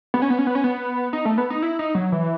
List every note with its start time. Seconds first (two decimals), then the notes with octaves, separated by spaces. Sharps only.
0.14 B3
0.22 C#4
0.30 B3
0.38 C#4
0.47 B3
0.55 C#4
0.64 B3
1.13 D#4
1.25 A3
1.38 B3
1.50 D#4
1.62 E4
1.79 D#4
1.95 F#3
2.12 E3